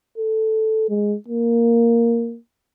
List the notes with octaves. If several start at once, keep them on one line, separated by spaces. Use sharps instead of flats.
A4
G#3
A#3